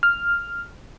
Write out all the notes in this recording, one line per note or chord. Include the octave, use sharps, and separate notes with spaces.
F6